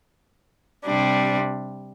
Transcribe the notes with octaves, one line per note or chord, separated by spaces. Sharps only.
C3 G3 D4